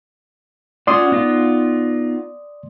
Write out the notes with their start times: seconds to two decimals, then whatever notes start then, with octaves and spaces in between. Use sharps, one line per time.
0.87 C#4 F4 F#4 D5 C6 D#6
1.12 B3 D#4 F4